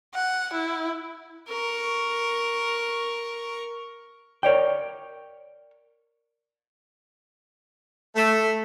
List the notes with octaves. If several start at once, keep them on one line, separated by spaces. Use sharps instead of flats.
F#5
E4
A#4 C#6
A#4 C#5 D5 G5
A3